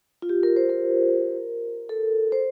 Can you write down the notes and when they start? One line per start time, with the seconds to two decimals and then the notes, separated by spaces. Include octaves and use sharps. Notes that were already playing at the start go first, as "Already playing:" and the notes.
0.22 F4
0.29 G4
0.43 A#4
0.56 C5
0.70 A#4
1.89 A4
2.32 C5